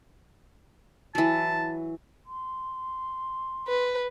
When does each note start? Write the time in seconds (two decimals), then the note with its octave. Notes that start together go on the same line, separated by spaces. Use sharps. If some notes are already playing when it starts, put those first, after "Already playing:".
1.15 E3 F#3 A5
2.26 C6
3.68 B4